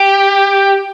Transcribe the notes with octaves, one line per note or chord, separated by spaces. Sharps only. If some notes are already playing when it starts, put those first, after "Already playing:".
Already playing: G4